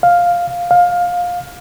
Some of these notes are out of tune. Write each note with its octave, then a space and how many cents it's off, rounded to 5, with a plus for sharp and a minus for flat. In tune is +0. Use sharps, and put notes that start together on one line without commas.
F5 +5
F5 +20